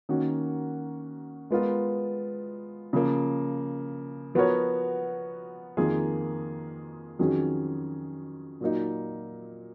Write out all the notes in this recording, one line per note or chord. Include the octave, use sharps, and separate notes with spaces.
D#3 A#3 C#4 F#4
G#3 B3 F4 A#4
C#3 F3 A#3
F3 B3 F#4 A#4 C#5
F2 D#3 A#3 F4 G#4
F2 D#3 F#3 C#4 G#4
A#2 F#3 A#3 D#4